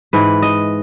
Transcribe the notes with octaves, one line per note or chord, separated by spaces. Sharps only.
G#2 E3 B4
D#5